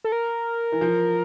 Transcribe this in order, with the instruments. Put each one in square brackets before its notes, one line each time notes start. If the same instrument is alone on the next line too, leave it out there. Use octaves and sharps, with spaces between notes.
[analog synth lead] A4
A#4
[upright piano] E3
F3